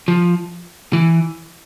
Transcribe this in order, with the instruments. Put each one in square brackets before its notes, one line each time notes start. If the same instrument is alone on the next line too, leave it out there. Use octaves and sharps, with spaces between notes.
[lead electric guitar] F3
E3